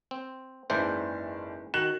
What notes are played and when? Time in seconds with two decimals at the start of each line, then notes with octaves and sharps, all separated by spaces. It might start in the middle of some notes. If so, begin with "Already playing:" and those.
0.11 C4
0.70 F#1 G#2 E3 C5 D5 A5
1.74 D#3 F#4 F#6 E7